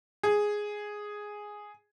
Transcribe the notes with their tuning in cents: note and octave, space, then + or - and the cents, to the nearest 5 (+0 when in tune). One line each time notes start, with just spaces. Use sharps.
G#4 +0